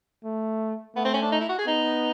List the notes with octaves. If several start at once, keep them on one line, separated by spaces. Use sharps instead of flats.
A3
A3 B3
C4
C#4
D4
D#4
E4
F#4
G#4
B3 D#4